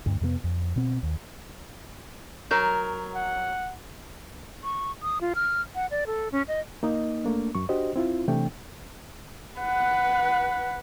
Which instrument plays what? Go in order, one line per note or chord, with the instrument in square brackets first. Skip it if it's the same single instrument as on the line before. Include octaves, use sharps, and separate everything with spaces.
[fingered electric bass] D2 G2
F2 C3 G3 B3
F2
B2 C4
D#2
[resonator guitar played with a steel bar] F#3 A#4 [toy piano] C#5 A#5
[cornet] F#5
[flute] C#6
D#6
F4
F6
F#5
D5
A4
C#4
D#5
[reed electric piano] A#3 D#4 D#5
A3 A#3 D4
F#2 C#6
D4 F#4 G4 C5 D#5
C4 E4 F4
C3 E3 A3 D4 G5
[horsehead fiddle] B4 F#5